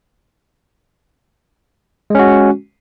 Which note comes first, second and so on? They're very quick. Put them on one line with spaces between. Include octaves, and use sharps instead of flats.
G#3 C#4 F#4